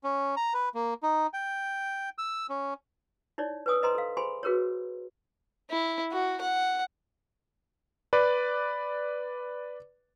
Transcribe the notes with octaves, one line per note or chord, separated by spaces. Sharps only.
C#4
A#5
B4
A#3
D#4
G5
E6
C#4
D#4 E4 C#5 D5
B4 C#5 G#5 D#6 E6
B4 C5 D#5 G#5 A#5 C6
A4 F5
G#4 C5 G#5 B5 C6
F#4 G#4 A#4 B4 C#5
E4
F#4
F#5
B4 D5